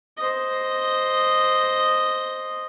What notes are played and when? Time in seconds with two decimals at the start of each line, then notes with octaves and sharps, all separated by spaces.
0.17 C5 D#5